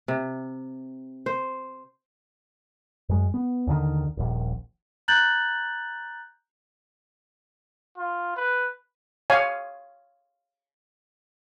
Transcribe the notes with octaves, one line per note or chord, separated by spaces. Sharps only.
C3
C5
F#2 G#3
B3
D#2 D3 D#3
D#1 A#1
A#5 F#6 G6 A6 F#7
F4
B4
C#5 F5 G#5